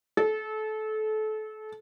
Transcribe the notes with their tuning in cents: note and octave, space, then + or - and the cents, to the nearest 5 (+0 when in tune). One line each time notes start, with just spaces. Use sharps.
A4 -30